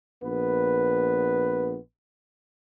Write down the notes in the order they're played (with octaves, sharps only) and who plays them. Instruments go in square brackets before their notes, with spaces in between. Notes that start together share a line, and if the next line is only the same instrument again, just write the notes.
[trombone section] A#1 B3 B4